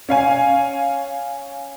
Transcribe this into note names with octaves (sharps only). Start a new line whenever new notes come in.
C#4 F5 G#5